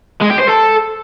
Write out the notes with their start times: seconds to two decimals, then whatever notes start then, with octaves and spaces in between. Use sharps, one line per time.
0.21 G#3
0.30 G4
0.39 C5
0.48 A4